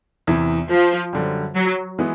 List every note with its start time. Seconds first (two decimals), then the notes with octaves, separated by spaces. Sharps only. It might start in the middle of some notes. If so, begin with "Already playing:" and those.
0.27 E2 C3 E3
0.71 F3
1.13 F#2 D3 G3
1.55 F#3
1.99 E3 G#3 B3